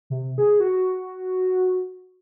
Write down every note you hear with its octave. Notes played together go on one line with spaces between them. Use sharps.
C3
G#4
F#4